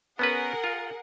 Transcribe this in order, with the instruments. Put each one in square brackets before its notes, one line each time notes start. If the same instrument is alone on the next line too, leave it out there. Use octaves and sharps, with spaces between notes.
[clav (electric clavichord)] B3 C#4 B4 [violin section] G#4 A#4 F#5
[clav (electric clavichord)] F4